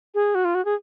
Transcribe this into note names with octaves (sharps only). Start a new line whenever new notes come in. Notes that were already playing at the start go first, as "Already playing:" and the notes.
G#4
F#4
F4
F#4
G#4